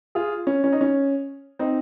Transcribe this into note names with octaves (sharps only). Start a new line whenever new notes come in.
F4 G#4
C#4
C#4
D#4
C#4
C4 D#4